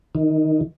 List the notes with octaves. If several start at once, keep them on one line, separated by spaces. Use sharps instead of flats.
D#3